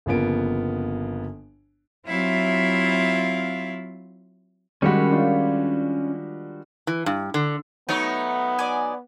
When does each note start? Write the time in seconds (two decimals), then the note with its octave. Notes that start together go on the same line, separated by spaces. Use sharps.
0.06 G1 C#3 F3 A#3 B3 D7
2.07 F#3 C4 E4 F4 E5 F5
4.82 D#3 G3 G#3 C#4 F#4 C#5 B5
5.11 D4 F4 C5
6.87 E3
7.06 G2
7.34 D3
7.89 F#3 A3 B3 D#4 C#5
8.59 D5 G#5